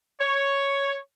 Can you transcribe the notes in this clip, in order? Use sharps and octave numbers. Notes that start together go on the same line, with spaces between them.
C#5